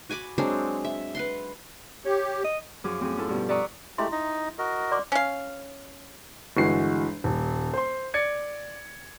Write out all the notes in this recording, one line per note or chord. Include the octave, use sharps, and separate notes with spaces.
F#4 G#5 B5 D6
F#3 G#3 C4 D4
E5
B4 F#5 C6
G4 C#5
D#5
F#2 F3 F#3 F4 G#4 D6
A2 C4 F#4 G#4
C4 C#4 E4 F4 A4
G2 B2 F3
D5 E5 F#5 A#5 C#6 D#6
G#3 A3 E4 G4 E5 C6
D#4 D#5
F#4 A#4 D#5
D5 C6 D6
C#4 F5
G1 E3 G#3 F#4 C7
D#1
C5 C6
D5 G#6 C#7